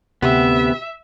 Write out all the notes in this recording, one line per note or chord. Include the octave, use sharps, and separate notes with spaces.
D2 C3 B3 G4 E5